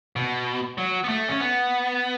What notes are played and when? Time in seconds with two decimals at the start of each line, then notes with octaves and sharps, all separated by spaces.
0.16 B2
0.78 F#3
1.04 B3
1.09 A3
1.29 C#4
1.40 B3